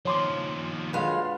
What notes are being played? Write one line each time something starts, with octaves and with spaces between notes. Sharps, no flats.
D#2 F3 C#5 C6 D6
F#2 D3 G#3 F4 B4 F5